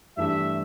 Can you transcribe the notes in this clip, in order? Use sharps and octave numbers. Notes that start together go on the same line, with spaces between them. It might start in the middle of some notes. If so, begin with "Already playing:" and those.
G2 E3 A3 D4 G4 E5